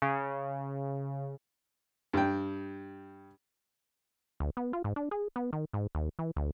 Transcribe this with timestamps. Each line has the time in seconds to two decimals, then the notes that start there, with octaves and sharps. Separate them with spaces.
0.02 C#3
2.13 G2 G5
4.40 D2
4.57 B3
4.73 F4
4.84 G#2
4.96 D4
5.11 G#4
5.36 B3
5.53 D#3
5.73 G#2
5.95 D#2
6.19 E3
6.36 D2